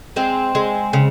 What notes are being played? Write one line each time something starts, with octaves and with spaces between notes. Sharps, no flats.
G#3 C4
G#3
C#3